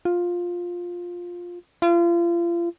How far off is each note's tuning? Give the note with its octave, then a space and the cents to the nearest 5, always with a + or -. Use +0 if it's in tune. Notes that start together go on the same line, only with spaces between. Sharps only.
F4 +10
F4 -35